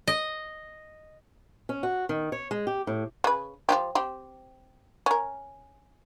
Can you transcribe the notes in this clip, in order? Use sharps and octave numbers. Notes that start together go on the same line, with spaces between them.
D#5
C#4
F#4
D#3
C#5
G#3
G4
A2
C#3 B4
F3 F4 G4
C4 G4
C#4 A#4